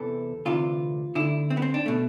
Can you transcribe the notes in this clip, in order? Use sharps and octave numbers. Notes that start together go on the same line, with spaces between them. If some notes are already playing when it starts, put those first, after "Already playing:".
Already playing: E2 C3 E3 A4
D2 C3 E3 F4
D2 D3 E4
C4
B3
C4
D4
B2 A3